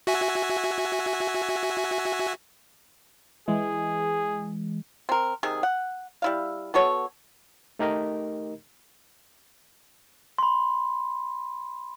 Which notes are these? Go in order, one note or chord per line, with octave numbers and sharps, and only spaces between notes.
F#4 E5 G#5
E3 G#3 G#4
C4 A#4
C3 D#3 G#4
F#5
G3 E4 F5
B3 F#4 A4 C#5
A3 D#4 G4 A#4 D#5
B5 C6